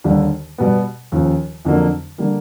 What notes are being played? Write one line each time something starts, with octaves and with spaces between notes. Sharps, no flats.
D#2 D3 G3
B2 G3 B3
D#2 C#3 F3
F2 D3 F#3 A#3
D3 G3 A#3